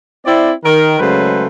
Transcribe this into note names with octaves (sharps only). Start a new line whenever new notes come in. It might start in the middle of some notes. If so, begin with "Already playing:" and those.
C4 E4 D5
D#3 A#4
C#3 F#3 G#3 A3 B4 C5